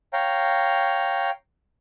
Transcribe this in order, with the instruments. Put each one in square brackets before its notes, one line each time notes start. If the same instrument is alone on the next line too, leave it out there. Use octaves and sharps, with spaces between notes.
[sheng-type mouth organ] C#5 F5 G5 A#5